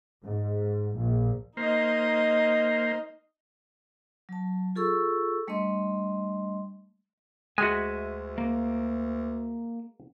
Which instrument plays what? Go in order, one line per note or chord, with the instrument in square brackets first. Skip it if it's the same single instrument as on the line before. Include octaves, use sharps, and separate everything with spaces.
[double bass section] G#2
A#1
[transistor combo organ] A#3 C5 [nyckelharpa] D#4 D#5
[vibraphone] F#3 A5
F4 G#4 A4 C#6 E6
G3 A3 D4 D#5 C6
[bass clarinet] D2 [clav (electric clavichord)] G#3 F#4 [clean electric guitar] E5 G#5
[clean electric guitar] A#3